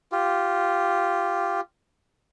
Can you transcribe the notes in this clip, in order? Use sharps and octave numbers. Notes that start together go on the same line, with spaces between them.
F4 G4